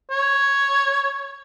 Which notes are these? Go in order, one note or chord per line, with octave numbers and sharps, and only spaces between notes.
C#5